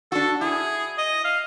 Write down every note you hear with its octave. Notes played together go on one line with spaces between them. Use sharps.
D4 F#4 A4
E4 G#4
D#5
F5